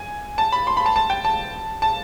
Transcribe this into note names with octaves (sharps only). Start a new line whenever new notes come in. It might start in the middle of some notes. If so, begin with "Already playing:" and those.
Already playing: G#5
A5
B5
C6
B5
A5
A5
G5
A5
A5